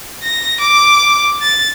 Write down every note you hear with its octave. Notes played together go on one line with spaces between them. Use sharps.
A#6
D6
A6